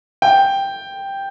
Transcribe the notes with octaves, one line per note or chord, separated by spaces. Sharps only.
G5